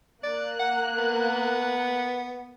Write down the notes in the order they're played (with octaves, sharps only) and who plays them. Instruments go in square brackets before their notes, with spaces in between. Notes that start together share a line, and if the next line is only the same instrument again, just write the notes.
[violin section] A#3 F#6 [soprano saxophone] D5
[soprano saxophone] F#5
B3